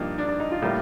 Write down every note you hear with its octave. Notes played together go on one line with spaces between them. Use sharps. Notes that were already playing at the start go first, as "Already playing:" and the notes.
Already playing: G2 F3 A#3 D#4
D4
D4
D#4
F4
A2 G3 A#3